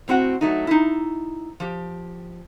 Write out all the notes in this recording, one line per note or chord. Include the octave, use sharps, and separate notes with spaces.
A2 C4 F#4 F#5
F#3 A3 D#4
D#4 E4
F3 G4